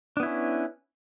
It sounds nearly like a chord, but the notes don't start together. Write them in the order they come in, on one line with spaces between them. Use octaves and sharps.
D4 B3 E4 C#4